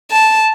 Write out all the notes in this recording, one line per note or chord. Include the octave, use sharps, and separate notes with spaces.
A5